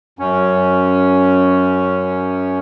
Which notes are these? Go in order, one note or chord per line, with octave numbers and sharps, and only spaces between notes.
F#2 C#4